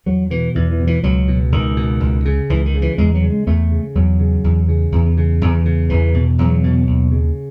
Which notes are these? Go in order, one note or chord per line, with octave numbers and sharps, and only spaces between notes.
E2 F#3
B2 E3
E2 E3
E3
B2
E3
C#2 F#3
B2
C#2 D#3
B2
C#2
C#3
C#2 E3
D#3
C#3
E3
E2 G#3
F#3
C#3
G#3
E2 A3
C#3
E2 F#3
C#3
E2
C#3
E2
C#3
E2
C#3
E2 E3
B2
E2 F#3
B2
D#2
C#3